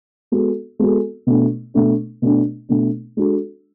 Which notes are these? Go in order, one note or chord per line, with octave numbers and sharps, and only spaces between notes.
G#3 B3 F#4 A4
G#3 B3 F#4 A4
B2 A3 D4
B2 A3 D4
B2 A3 D4
B2 A3 D4
G#3 D4 F#4 A4